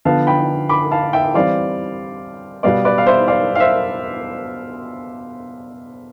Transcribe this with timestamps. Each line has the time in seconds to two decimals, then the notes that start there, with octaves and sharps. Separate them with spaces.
0.05 D3 F3 B3 F5 A5
0.27 G5 B5
0.69 B5 D6
0.91 F5 A5
1.13 E5 G5
1.34 E3 G3 C4 D5 F5
2.63 B2 G3 B3 D5 F5
2.85 B4 D5
2.98 F5
3.07 C5 E5
3.28 D5 F5
3.55 F5
3.60 C5 E5